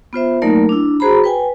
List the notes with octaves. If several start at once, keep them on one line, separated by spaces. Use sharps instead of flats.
B3 F4 C5 E5
F#3 A3 A#3 D#4 A#4 D5
D4 E4
F#4 G#4 C5 A#5 B5
B4 G5 G#5